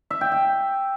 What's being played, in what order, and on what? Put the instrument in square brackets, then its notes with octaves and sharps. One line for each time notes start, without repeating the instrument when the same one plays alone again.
[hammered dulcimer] E5
G5
G5